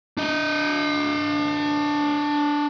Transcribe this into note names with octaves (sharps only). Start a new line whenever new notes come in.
D4 D#5